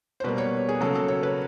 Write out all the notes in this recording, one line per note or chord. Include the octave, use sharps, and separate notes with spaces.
C5
B2 G3 A#3 B4
C#5
G#4
C#3 F#3 A#3 A4
A4
C#5
B4